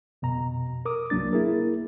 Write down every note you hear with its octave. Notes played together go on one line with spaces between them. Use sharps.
F2 B2 A#5
A#4 D6 D#6
C2 F#3 A#3 D4 A6
A#3 E4 G#4 A#4